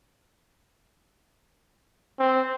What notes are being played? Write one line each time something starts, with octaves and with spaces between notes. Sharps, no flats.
C4